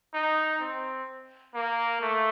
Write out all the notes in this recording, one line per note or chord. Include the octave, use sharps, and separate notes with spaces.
D#4
C4
A#3
A3